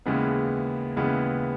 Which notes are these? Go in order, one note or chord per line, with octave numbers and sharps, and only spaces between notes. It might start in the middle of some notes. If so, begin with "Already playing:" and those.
D#2 C#3 E3 G#3 B3
D#2 C#3 E3 G#3 B3